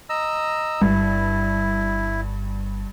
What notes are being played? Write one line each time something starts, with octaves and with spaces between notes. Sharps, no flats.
D#5 A#5 E6
G1 G2 E4